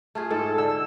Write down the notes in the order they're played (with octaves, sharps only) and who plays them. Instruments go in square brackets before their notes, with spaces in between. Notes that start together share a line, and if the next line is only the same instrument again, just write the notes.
[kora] A3 F4 G#4
[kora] G#2 [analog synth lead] A4
[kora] D3 [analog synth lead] E6